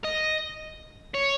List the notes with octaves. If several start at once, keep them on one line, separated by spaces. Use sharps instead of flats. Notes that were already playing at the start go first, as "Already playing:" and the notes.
D#5
C#5